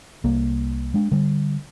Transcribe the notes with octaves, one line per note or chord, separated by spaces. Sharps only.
C2 A#3
G#3 D4
D3 G3